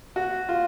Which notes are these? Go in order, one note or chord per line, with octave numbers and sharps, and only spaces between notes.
F#4
F4